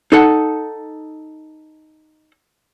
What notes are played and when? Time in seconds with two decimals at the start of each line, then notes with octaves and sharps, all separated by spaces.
0.12 D#4 A4 F#5